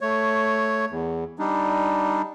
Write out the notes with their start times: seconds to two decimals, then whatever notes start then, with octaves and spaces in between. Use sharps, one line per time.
0.01 A3 C#5
0.90 E2
1.39 G3 D4 D#4